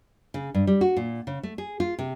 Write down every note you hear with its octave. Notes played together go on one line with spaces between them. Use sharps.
C#3
G2
G3
F#4
A#2
C#3
A3
G#4
F4
C3